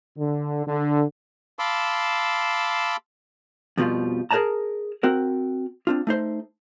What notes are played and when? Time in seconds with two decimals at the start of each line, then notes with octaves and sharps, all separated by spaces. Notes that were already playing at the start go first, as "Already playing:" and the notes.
0.18 D3
0.67 D3
1.59 F5 A5 B5 C6 D6 E6
3.78 F2 B2 F3 G3 F4
4.31 G#4 A#4 C5 D5 A5 A#5
5.03 C4 F#4 A#4
5.87 C4 D4 F4
6.07 A3 D#4 C5